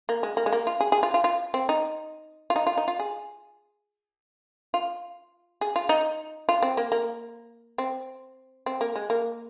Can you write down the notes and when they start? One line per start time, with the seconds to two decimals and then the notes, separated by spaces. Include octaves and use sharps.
0.09 A#3
0.23 G#3
0.37 A#3
0.46 G#3
0.53 A#3
0.67 F4
0.81 G#4
0.92 G#4
1.03 F4
1.14 F4
1.24 F4
1.54 C4
1.69 D#4
2.50 F4
2.56 D#4
2.67 F4
2.78 D#4
2.88 F4
2.99 G#4
4.74 F4
5.61 G#4
5.76 F4
5.89 D#4
6.49 F4
6.62 C4
6.77 A#3
6.92 A#3
7.78 C4
8.66 C4
8.81 A#3
8.96 G#3
9.10 A#3